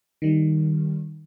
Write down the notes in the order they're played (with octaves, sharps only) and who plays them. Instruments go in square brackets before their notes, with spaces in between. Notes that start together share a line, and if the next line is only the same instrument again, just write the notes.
[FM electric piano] D#3 G3